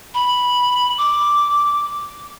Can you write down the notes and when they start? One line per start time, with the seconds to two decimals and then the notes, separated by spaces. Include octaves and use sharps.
0.14 B5
0.97 D6